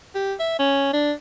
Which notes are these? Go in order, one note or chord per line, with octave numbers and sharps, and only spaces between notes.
G4
E5
C#4
D4